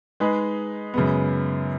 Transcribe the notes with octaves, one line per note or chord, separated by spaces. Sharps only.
G#3 D#4 G#4 B4
F#2 C#3 G#3 B3